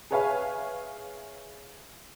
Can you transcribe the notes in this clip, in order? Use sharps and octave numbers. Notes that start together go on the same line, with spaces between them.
G#4 B4 C#5 E5 F5 G#5